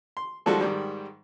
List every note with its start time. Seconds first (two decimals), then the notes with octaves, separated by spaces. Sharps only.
0.17 C6
0.46 D#3 F3 G3 G#3 F#4 A4
0.61 G#2 D#3 G3